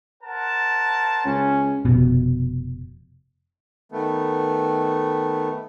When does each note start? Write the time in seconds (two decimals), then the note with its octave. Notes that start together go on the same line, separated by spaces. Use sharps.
0.23 A#4 C5 F#5 A5
1.25 C#2 C#4
1.85 F1 B2
3.92 D#3 A3 B3